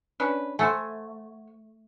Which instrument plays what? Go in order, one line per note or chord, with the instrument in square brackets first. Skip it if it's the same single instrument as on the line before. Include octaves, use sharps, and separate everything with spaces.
[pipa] C#4 D4 B4
[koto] A3 [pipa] C5 F#5 G#5